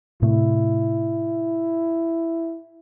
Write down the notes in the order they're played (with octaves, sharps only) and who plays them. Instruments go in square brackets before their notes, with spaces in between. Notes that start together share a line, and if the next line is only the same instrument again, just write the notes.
[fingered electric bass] A2 C3 A3 [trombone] E4